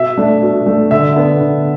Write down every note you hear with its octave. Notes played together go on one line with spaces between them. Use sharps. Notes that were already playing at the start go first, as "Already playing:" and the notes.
Already playing: B2 E5
A3 D4
B2
A3 D4
D3 E5
B3 D4
D3